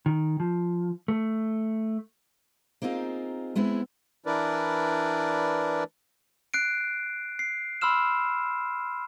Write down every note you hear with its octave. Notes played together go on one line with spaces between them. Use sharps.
D#3
F3
A3
A#3 C4 D#4 F4 G#4
G#3 B3 C4 E4
E3 D4 E4 A#4 B4 D5
F#6 C7 D7
C7
B5 C6 E6 F6 E7